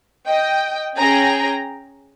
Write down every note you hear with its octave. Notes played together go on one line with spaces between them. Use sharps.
D#5 G5
C#4 G#4 G5 A#5